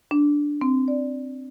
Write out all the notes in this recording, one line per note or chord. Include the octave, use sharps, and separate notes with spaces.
D4
C4
D5